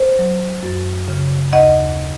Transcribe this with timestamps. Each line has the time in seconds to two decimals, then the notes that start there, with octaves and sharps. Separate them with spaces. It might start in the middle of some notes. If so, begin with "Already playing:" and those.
Already playing: C5
0.19 F#3
0.63 F#2
1.08 C#3
1.53 D#2 D#5 F#5